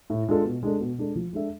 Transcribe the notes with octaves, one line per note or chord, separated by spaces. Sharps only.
A2
G#3 D4 F4 A4
B2
G#3 D4 A4
B2
G#3 D4 A4
F3
G#3 D4 A4 E5